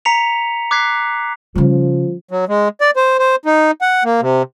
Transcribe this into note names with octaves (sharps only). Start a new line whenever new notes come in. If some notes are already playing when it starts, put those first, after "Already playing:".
A#5 B6 C#7 F7
D6 F#6 G#6 B6 C7
C#3 F3 G3
F#3
G#3
D5
C5
C5
D#4
F#5
A#3
C3